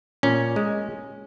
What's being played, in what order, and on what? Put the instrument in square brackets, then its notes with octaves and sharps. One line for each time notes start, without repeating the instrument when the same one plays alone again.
[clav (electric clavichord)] A#2 C#4
G#3